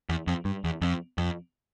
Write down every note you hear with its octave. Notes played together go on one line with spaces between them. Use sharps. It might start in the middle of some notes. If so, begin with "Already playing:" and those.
E2
F2
G2
E2
F2
F2